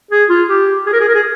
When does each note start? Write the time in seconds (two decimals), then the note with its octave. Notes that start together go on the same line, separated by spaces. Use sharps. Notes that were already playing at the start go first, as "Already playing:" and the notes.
0.11 G#4
0.30 F4
0.49 G4
0.86 G#4
0.92 A#4
1.00 G#4
1.07 A#4
1.14 G#4